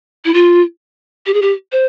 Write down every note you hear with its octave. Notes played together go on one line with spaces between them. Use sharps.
E4
F4
G4
G#4
G4
C5